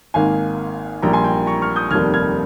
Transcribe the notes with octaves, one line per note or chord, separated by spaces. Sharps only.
G#1 G#2 D#3 A#3 F5 G#5
A#1 A#2 G3 A#3 G5 A#5
G#5 C6
G5 A#5
A#5 C#6
C#6 F6
D#6 G6
F1 D#2 D#3 G3 A#3 F6 G#6
F6 G#6